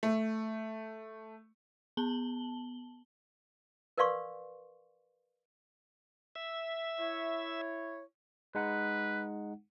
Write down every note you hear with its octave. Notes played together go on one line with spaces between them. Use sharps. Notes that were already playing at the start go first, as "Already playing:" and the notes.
A3
B3 A5 F#7 G7
A#4 B4 D5 F5 C6 C#6
E5
E4 C#5
G#3 D#4 B4 F#5